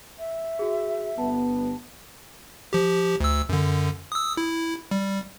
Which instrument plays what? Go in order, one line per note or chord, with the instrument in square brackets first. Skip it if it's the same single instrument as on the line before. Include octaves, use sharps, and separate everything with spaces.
[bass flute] E5
[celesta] F#4 G#4
[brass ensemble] G1 B3 [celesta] A5
[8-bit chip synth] F3 G4
D2 E6
F#2 D3
D#6 E6
E4
G3